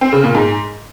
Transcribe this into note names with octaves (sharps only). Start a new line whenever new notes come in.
C4
C#3
A#2
G#2